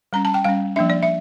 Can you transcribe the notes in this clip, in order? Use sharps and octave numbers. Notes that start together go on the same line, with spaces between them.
G3 C#4 A#5
A5
G5
G3 C#4 F5
F3 A#3 D4 E5
D5
E5